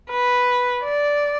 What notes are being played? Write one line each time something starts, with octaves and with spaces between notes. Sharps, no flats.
B4
D5